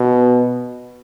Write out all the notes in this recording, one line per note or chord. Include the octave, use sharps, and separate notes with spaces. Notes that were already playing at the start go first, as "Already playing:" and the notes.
Already playing: B2